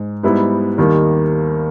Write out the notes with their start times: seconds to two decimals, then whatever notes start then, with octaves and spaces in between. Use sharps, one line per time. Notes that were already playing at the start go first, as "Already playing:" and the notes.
Already playing: G#2
0.23 G#2 G3 B3 E4
0.78 D#2 D#3 G3 A#3